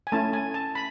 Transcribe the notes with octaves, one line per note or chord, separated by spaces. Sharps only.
G#5
A3 C#4 E4 A5
G#5
A5
B5